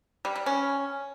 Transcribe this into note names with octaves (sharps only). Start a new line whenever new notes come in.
G3
G3
C#4